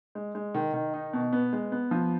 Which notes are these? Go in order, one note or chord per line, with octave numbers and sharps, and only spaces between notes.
G#3
G#3
D#3
D#3
D#4
B2
B3
G#3
B3
F3